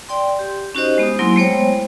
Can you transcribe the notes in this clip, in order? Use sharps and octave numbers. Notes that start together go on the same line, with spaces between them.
D5 G5 C6
G4
C#4 D#4 F#4 G4 C5 D#5
G#3 B3 G4 D#6
F#3 A#3 E4 G#5 C6
G#3 A3 B3 C5 C#5 G5